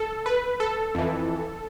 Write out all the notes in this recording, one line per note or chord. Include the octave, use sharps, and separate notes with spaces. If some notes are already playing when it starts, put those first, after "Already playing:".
Already playing: A4
B4
A4
F2 E3